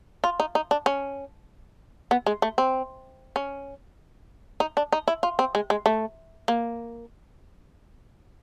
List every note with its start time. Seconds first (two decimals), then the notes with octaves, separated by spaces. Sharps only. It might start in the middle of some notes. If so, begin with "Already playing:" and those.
0.24 F4
0.40 D#4
0.55 D#4
0.71 D4
0.86 C#4
2.11 B3
2.26 G#3
2.42 A3
2.58 C4
3.36 C#4
4.60 D#4
4.77 D4
4.92 D#4
5.08 E4
5.23 F4
5.39 C4
5.55 G#3
5.70 G#3
5.86 A3
6.48 A#3